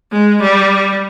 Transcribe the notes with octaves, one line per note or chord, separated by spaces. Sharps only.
G#3
G3